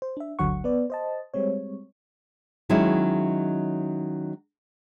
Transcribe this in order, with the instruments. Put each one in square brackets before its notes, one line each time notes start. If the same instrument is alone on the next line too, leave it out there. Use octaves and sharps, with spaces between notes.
[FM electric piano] C5
D4 E5
G1 D2 D3 F#3 F#5 C#6
B3 B4 D5
C5 D#5 A5
G3 G#3 C4 C#5
[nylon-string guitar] D#3 F#3 G#3 C#4 E4